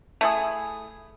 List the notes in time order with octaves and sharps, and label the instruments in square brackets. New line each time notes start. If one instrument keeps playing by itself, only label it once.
[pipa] A3 E4 G#4